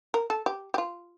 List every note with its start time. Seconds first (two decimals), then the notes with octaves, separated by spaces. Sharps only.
0.14 A#4
0.30 A4
0.46 G4
0.74 G4
0.78 F4